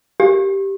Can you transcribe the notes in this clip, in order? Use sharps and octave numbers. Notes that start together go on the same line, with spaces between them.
G4